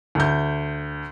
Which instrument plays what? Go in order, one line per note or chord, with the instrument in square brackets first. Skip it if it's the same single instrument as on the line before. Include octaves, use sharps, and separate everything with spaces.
[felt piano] D2 G6